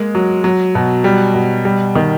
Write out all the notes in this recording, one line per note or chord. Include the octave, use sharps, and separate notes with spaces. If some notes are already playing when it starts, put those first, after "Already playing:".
Already playing: G#3 A#3
F#3
F#3
B2
G3
B2
G3
D#3